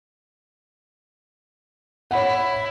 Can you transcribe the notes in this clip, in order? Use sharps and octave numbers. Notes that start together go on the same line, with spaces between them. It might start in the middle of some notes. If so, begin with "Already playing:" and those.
E4 C#5 F#5